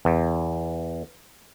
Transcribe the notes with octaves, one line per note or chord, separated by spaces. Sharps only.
E2